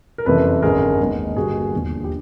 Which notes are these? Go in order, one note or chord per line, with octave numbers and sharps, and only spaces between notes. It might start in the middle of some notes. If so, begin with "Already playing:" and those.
A#4
F#1 F2 C3 E3 A4 B4
G#1 F#2 D3 G#4 A#4
D#2 D#3 G#3 B3
G2 D3 G3 A#3 F#4 G#4
E1 D#2 D3 F3
G4